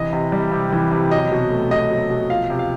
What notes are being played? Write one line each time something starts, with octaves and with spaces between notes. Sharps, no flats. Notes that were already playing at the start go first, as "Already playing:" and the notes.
Already playing: C3 E3 D#5
C3
G3
C3
E3
C3
F#3 D#5
B2
A3
B2 D#5
F#3
B2
F3 F5
C3
F5